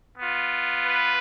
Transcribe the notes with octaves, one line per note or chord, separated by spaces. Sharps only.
B3 F4
B4